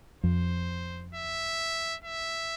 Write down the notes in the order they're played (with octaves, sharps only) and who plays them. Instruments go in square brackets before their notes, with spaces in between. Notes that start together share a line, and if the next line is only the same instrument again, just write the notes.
[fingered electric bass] F2 [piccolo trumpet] C5
[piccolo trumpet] E5
E5